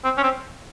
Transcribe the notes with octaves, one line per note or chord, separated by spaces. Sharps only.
C4
C#4
C4